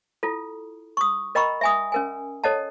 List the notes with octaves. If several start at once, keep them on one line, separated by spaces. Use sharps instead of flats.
E4 F4 A4
C#6 D#6
A#4 D#5 G5 A#5 B5 C#6
E5 G#5 D#6
C#4 A#4 G#5
A4 C#5 D#5 F#5 A5